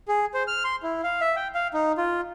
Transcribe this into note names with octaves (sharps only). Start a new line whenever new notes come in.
G#4
C5
F6
C6
E4
F5
E5
G5
F5
D#4
F4